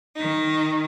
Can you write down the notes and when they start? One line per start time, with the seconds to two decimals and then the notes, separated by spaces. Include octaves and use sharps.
0.16 D#3 D#4